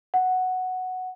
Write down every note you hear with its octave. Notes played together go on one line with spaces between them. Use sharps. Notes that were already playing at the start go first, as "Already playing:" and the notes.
F#5